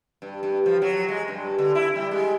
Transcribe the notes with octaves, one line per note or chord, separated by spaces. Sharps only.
G2
G2
F3
F#3
G#3
G2
D3
E4
G3
G#3